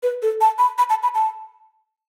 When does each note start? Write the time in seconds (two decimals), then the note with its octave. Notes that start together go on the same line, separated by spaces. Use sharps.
0.03 B4
0.22 A4
0.41 A5
0.59 B5
0.78 B5
0.90 A5
1.03 B5
1.15 A5